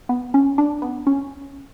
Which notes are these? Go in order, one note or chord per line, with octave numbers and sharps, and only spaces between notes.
B3
C#4
D4
B3
C#4